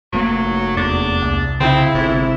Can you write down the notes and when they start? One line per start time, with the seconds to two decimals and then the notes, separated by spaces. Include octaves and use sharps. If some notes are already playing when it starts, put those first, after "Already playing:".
0.13 F1 F#3 A3 A#3
0.77 E2 D4
1.22 C2
1.60 C#3 C4 E4
1.95 G1 G#2 C3